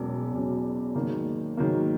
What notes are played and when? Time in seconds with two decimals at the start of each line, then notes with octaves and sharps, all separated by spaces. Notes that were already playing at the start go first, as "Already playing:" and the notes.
Already playing: E1 E2 B2 F#3 C#4
0.32 E1 E2 B2 F#3 C#4
0.94 G#2 D#3 F#3 A#3
1.57 G#2 D#3 F#3 A#3